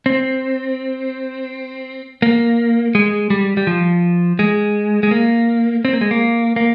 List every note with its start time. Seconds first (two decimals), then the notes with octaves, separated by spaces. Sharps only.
0.06 C4
2.22 A#3
2.95 G#3
3.30 G3
3.57 G3
3.67 F3
4.39 G#3
5.03 G#3
5.11 A#3
5.85 C4
5.93 A#3
6.01 G#3
6.11 A#3
6.56 A#3